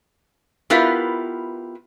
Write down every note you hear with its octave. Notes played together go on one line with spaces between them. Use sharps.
B3 E4 F4 G4 A#4 B4